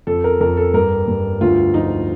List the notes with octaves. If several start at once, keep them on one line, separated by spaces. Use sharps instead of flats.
F2 A4
A#4
F2 A#4
A4
G2 A#4
G2
D2 F4
F3 D#4